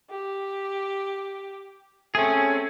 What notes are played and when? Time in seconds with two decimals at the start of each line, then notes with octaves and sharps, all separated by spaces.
0.10 G4
2.15 A3 C4 C#4 G#4